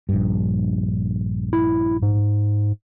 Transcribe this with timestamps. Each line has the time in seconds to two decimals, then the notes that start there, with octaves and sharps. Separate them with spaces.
0.09 A#1 G2
1.53 E4
2.02 G#2